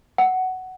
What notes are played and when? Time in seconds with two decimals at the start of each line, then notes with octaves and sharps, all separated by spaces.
0.18 F#5